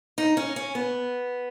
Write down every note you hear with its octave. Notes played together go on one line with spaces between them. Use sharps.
D#4
C#4
C#4
B3